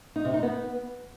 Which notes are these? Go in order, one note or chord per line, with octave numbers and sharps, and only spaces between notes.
D#4
C3
D#4
B3